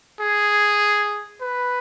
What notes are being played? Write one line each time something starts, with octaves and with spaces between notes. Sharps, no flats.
G#4
B4